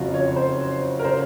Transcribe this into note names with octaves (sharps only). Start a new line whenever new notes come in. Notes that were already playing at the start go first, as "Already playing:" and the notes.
Already playing: F#1 F2 C#3 F4 F#4
C#5
C5
A#4
C#3 C5